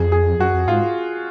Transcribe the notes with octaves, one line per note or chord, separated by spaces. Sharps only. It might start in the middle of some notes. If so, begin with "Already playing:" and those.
Already playing: F2 G#4
G#4
F#2 F#4
F2
G#2 F4